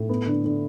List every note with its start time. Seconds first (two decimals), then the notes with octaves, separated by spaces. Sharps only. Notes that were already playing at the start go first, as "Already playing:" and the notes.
Already playing: A2
0.09 B3
0.27 D3
0.45 D3